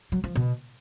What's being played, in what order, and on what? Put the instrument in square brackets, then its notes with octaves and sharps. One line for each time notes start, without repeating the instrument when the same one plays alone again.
[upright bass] F#3
F3
B2